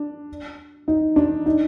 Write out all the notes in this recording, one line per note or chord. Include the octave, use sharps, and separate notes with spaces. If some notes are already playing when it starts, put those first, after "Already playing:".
Already playing: D4
D#4
D4
D#4